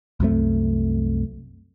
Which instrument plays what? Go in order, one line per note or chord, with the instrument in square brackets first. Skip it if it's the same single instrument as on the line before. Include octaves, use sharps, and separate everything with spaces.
[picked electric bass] C2 F#2 C3 A3